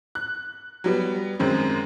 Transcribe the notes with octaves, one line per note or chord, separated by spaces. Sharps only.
F#6
F#3 G3 B3
F#2 D#3 G#3 C4